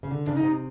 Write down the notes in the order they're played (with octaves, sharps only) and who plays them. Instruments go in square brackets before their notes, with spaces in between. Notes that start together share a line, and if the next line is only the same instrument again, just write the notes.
[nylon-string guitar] C#3
D3
[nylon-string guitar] C#3 [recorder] D4
[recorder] D#4
[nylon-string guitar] C3